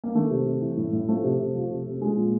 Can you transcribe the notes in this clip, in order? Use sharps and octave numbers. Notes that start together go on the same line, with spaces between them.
A#3
D#3 A3
C3
C3
E3
A2
A2
F3 A3
C3
C3
F3
C3
C3
F3 G#3
A#2